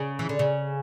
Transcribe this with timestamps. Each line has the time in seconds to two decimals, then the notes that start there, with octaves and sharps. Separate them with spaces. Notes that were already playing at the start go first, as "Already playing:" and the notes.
Already playing: C#3
0.19 E3
0.29 D3
0.39 C#3